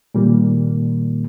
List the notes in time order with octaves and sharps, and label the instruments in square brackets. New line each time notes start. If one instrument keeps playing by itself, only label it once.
[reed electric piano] A#2 D#3 G3 A#3